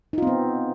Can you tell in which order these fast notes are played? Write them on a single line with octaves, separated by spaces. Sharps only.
D#4 F4 C4 B3